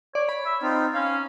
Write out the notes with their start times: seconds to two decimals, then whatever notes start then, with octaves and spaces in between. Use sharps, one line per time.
0.15 C#5 D5
0.29 B5
0.46 E5
0.62 C4 D#4 F4
0.94 C#4 F5